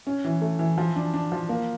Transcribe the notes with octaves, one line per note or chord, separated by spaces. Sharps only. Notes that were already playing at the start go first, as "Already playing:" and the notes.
C#4
E3
A3
E3
F3
D4
D4
F3
A#3